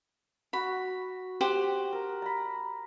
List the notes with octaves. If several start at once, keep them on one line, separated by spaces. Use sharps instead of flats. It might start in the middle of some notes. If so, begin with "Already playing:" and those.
F#4 B5
G4 C5 F#5
A#4
A#5 B5